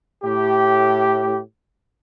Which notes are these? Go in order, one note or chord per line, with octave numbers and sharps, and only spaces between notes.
A2 G4